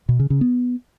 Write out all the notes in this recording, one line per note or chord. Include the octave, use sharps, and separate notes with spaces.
B2
C#3
C#3
B3